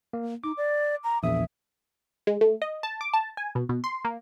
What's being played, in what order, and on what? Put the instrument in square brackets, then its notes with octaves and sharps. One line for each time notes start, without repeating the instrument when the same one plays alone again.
[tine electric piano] A#3
[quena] D#4 [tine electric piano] D6
[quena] D5
A#5
[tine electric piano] A#1 E2 D#6 [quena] E5
[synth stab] G#3
A3
D#5
A5
D6
A5
G#5
B2
B2
C6
A#3